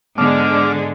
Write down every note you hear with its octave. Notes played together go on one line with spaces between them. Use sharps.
G#2 D3 G#3 B3 D6 F6